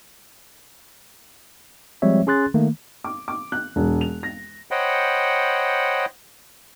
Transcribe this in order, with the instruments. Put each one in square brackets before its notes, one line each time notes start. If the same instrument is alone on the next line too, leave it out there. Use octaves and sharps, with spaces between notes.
[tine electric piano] F3 G3 G#3 C4 C#5 E5
C#4 G#4 C6 F#6 A6
D#3 A3 A#3
[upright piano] D6
D6
F#6
E1
F7
A#6
[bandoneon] C5 C#5 D#5 F#5 G5 B5